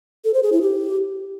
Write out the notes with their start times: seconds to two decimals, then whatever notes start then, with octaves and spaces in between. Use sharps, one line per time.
0.25 A4
0.34 C5
0.43 G#4
0.52 E4
0.62 G4